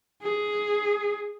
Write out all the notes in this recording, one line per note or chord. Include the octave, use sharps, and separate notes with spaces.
G#4